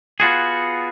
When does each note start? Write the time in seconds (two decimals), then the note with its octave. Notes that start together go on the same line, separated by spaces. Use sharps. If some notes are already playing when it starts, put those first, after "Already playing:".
0.20 B3 F4 F#4 G#4